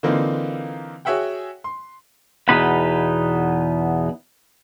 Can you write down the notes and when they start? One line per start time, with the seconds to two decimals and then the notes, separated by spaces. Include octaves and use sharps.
0.03 D3 E3 A#3 C4 D#4 F4
1.05 F#4 G#4 C#5 E5 F#5 G5
1.64 C6
2.49 E2 B2 D#4 B4 B5